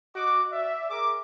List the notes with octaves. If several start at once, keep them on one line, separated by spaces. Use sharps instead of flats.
F#4 D#5 D6
D5 E5
G#4 A#4 D6